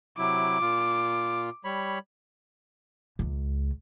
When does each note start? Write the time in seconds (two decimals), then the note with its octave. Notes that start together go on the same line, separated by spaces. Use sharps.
0.18 C3 F#3 E4 D6
0.61 A#2 F4
1.65 G3 C#5 B5
3.19 C#2